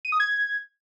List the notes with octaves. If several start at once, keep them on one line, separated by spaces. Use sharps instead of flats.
D#7
D#6
G#6